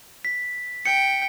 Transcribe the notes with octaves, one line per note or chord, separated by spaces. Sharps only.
B6
G5 C#7